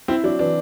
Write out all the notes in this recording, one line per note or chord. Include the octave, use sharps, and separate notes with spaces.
C4 E4
F#3 D4
E3 D4